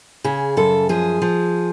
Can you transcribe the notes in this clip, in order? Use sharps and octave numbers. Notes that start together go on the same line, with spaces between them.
C#3 G#4
F#2 A4
F3 G#4
F3